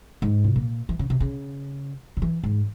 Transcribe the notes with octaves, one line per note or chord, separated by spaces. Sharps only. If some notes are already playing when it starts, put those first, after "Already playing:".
G#2
C3
A#2
E3
C#3
C3
C#3
C#3
E3
G#2